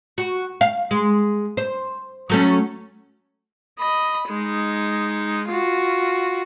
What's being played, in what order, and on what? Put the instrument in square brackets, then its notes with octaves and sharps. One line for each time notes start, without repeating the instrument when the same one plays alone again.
[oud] F#4
F5
G#3
C5
F#3 A3 C#4
[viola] D#5 B5
G#3 D#4
F4 F#4